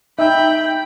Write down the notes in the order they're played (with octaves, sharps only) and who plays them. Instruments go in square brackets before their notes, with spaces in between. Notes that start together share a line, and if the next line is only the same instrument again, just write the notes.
[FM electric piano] D#4 [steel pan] E5 [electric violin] G5 [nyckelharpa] B5